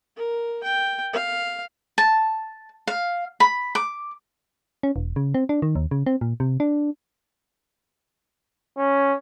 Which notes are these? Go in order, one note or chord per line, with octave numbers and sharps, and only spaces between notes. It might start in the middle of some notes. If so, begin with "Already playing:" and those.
A#4
G5
F5
A5
F5
B5
D6
C#4
E1
C#3
C4
D4
D#3
D#2
C#3
C4
A#2
C3
D4
C#4